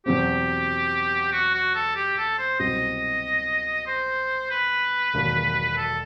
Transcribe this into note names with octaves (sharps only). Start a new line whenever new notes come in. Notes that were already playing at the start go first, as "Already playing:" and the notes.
E2 B2 F#3 C4 G4
F#4
F#4
A4
G4
A4
C5
C2 B2 F#3 C4 D#5
C5
B4
E1 D#2 D#3 F#3
A4